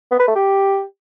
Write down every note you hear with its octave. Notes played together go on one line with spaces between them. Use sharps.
B3
B4
A3
G4